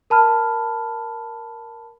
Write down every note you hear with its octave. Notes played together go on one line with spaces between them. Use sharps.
A#4 A5 B5 F6